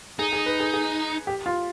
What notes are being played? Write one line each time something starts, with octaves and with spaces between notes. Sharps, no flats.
D#4 G#4
G#4
B4
G#4
G#4
G4
F4